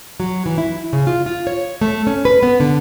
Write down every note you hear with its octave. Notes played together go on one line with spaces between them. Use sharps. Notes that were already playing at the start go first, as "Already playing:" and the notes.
F#3
E3
E4
C#3
F4
F4
C#5
A3
C#4
B4
B3
D3